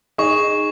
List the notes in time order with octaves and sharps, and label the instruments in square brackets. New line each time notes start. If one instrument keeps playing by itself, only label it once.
[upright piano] D#4 G#4 [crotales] C#6